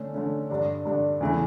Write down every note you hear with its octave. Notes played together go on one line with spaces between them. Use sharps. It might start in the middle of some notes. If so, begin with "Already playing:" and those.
Already playing: D3 A3 C#4
D3 A3 C#4
G2 D3 G3 D4
G2 D3 G3 D4
E2 C#3 E3 A3 E4